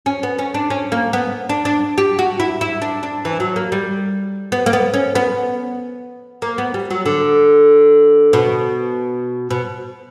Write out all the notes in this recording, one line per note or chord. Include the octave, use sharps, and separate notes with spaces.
C#4
B3
C#4
D4
C#4
A#3
B3
D4
D4
G4
F#4
E4
E4
D4
D4
E3
F#3
A#3
G3
B3
A#3
B3
C#4
B3
A#3
B3
G3
F#3
D3
B2
B2